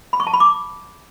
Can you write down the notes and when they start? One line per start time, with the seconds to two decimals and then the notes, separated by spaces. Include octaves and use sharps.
0.13 B5
0.20 C#6
0.27 A5
0.33 B5
0.40 D6